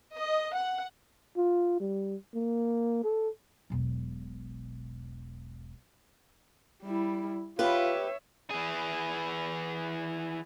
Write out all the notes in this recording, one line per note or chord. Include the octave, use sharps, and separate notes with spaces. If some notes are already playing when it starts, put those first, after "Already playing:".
D#5
F#5
F4
G3
A#3
A4
E1 B1
G3 E4
F4 G4 B4 C#5 E5
E3 G#4